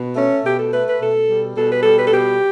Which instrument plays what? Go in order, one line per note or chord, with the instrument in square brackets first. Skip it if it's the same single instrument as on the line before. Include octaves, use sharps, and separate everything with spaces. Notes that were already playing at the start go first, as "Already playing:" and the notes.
Already playing: [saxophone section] B2
A3 C#4
B2 G4
A4
A3 B4
B4
B2 A4
G3
B2 A4
B4
G3 A4
B4
A4
B2 G4